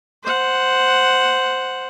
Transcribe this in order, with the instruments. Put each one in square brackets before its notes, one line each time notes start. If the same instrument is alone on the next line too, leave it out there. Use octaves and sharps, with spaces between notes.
[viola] C5 F#5